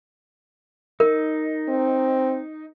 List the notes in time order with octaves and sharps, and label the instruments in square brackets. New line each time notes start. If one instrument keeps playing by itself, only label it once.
[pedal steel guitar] D#4 [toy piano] A#4
[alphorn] C4